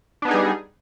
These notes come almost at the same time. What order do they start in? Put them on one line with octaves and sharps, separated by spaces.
D4 B3 D#4 G#4 G3